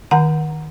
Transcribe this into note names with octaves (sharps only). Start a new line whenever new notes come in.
D#3 F#5 A#5